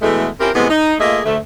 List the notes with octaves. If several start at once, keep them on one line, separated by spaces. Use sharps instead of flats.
E2 B2 E3 G#3 A3
C4 C#4 E4 F4 G4 A#4
A2 C3 E3 G#3 B3
D#4
A3 A#3 F4 G#4 D#5 E5
D2 A3